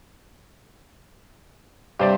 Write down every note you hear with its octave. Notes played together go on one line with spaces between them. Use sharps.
G2 C3 G4 C5 D5